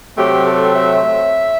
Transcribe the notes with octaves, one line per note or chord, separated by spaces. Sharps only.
C3 F#3 A3 C4 G4
A4
E5